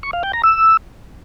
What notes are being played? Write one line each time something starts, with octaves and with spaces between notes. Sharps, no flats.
C#6
F5
G5
A#5
E6